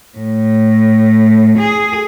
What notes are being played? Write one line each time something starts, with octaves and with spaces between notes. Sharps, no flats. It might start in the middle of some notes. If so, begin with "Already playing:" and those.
A2
G#4